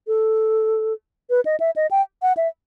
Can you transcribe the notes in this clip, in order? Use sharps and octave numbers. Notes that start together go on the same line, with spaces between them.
A4
B4
D#5
E5
D#5
G5
F#5
E5